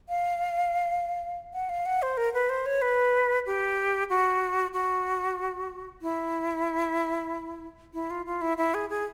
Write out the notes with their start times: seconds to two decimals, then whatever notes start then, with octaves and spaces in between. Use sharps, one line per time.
0.09 F5
1.54 F#5
1.69 F5
1.86 F#5
2.02 C5
2.17 A#4
2.34 B4
2.49 C5
2.66 C#5
2.82 B4
3.46 G4
4.09 F#4
4.73 F#4
6.02 E4
7.93 E4
8.10 F4
8.26 F4
8.41 E4
8.57 E4
8.74 G#4
8.89 G#4